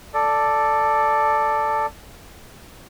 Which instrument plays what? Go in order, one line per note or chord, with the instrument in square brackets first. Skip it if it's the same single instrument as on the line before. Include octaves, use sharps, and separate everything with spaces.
[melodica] A4 D5